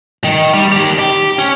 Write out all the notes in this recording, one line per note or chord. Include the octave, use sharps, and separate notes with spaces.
D#3
G3
D#3 G4
G4
C#4